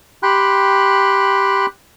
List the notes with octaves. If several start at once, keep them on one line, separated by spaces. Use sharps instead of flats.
G4 G5 B5 C6 F#6